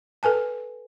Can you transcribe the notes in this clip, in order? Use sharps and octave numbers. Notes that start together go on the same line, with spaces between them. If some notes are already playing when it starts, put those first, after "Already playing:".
A4 B4 G#5 A5